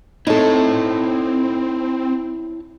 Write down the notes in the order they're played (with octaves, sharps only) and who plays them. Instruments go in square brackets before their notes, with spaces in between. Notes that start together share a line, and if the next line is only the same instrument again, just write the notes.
[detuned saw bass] C4 [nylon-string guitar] D#4 A4 [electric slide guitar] E4 C#5 A5